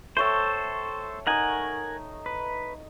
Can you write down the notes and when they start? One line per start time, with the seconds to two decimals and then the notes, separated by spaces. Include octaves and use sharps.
0.17 A3 A4 C5 C#5 G5
1.27 D#4 A#4 D#5 F#5 G#5
2.26 B4